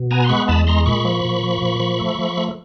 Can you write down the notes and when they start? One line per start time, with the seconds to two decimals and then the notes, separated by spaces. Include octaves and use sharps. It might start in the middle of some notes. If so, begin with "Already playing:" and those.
Already playing: B2
0.11 B3 G#5 A#5
0.24 C6
0.29 G#3 B5 C#6
0.48 E2 A5 B5
0.67 G#3 A#5 C6
0.86 A#2 B5 C#6
1.05 F3
1.24 A#2
1.43 F3
1.62 A#2
1.80 F3
1.99 A3
2.19 F3
2.37 A3